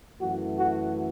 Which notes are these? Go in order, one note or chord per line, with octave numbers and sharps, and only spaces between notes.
F#2 E3 A3 F#4
F#4